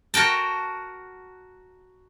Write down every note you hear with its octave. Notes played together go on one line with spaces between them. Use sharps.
F#4 A#4 G5 A5